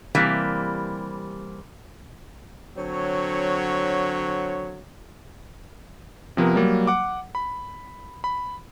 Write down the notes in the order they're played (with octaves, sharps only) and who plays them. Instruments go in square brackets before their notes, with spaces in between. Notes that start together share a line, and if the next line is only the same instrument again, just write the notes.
[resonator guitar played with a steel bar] C3 E3 G3 A#3
[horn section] D3 F#3 C4 C#5
[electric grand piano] C3 F3 B3 A#4
F#3 G3 A#3
F#5 D6
B5
B5